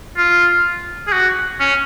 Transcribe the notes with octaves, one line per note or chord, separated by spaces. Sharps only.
F4
G#4
F#4
C#4